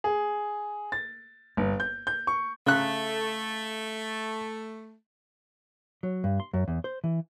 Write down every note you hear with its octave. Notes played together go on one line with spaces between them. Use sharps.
G#4
A6
G1
G6
G6
C#6
C#3 A3 F#6
F#3
G2
C6
F#2
E2
C5
E3